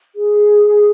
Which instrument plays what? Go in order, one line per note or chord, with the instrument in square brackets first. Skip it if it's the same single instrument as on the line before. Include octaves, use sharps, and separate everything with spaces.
[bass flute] G#4